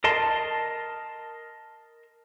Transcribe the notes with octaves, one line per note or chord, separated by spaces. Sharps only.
A#4 D#5 A5 C6